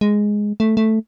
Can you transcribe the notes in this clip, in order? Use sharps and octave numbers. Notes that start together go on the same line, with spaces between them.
G#3
A3
A3